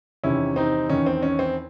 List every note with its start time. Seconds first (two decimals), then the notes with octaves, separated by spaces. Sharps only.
0.23 E2 C3 D#3 C#4 E4
0.56 C4 D#4
0.90 E2 D#3 C#4
1.06 C4
1.23 C#4
1.39 C4